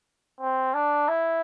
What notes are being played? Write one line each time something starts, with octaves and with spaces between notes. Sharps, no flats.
C4
D4
E4